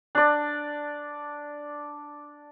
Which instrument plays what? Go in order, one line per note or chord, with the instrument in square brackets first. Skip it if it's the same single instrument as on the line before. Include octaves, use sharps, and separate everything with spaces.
[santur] D4 D5